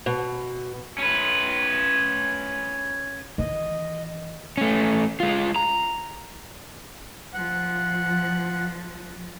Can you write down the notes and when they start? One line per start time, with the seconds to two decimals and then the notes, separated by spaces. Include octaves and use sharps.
0.06 B2
0.98 C#4 B4
3.38 D#3 E3 D#5
4.58 A3 C#4
5.20 G#3 F4
5.56 A#5
7.34 F3 F#5